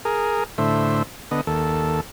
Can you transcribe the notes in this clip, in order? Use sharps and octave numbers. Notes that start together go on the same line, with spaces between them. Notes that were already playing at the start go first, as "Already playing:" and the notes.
G#4 A#4
A2 D3 C5 E5
D3 B3 D#5
D#2 A4